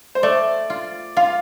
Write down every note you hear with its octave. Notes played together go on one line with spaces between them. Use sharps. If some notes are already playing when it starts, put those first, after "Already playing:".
C5
A3 D5
F4
F4 F5